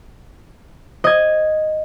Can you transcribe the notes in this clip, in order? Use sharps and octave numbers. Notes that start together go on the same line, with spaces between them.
D#5 G#6